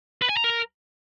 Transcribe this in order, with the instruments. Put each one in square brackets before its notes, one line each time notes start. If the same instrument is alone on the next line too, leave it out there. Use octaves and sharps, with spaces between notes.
[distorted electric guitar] B4
G#5
A#5
A#4